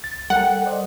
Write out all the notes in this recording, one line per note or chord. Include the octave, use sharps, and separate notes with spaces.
C#2 A6
G3 A4 A#4 F#5 G5
C5 D5 D#5